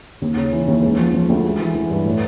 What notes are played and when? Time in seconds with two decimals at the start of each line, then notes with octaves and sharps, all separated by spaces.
0.22 D#2
0.37 C#3
0.52 E3
0.68 D#2
0.83 G#3
0.99 F3
1.14 F3
1.29 D2
1.44 G#3
1.59 E3
1.75 E3
1.90 G2
2.06 A2